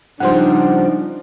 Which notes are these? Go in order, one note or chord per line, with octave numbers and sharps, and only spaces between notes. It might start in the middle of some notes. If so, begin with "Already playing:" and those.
C#3 F3 G3 D4 D#4 C5 F#5